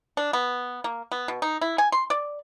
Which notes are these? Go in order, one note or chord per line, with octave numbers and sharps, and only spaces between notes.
D4
B3
A#3
B3
B2
D#4
E4
G#5
C6
D5